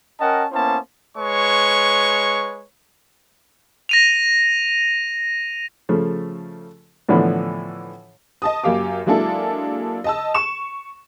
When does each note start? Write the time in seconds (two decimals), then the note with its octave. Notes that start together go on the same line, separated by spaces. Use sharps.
0.20 C#4 A#4 D#5 F#5 G5 A5
0.52 A#3 B3 C#4 E4 C5 A5
1.18 G#3 B4 C#5 C#6
3.89 A#6 D#7 F7
5.89 C#3 F3 A3
7.09 A2 D3 E3 F3 B3
8.42 D#5 A5 D#6
8.64 F#2 A#3 G4 F5 D6
9.06 F#3 G#3 A#3 D4 E4 A4
10.04 D#5 A5 E6
10.34 C#6 E7